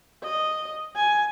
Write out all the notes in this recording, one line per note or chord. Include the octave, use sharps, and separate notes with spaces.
D#5
G#5